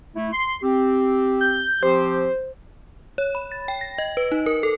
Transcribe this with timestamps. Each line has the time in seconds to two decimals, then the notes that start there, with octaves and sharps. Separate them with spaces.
0.16 A3 E4
0.33 C6
0.63 C4 G4
1.41 G6
1.83 F3 C4 G4 C5
3.18 C#5
3.35 B5
3.52 A6
3.68 G5
3.81 A#6
3.98 D#5
4.17 B4
4.32 D#4
4.46 A#4
4.63 A4